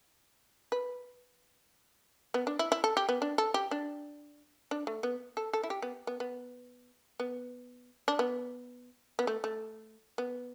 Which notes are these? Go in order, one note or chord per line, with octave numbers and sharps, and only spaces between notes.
B4
B3
D4
E4
E4
A4
G4
B3
D4
A4
G4
D4
D4
A3
B3
A4
A4
E4
G4
B3
B3
B3
B3
D4
B3
B3
A3
A3
B3